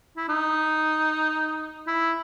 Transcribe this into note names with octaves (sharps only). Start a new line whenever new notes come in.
E4
D#4
E4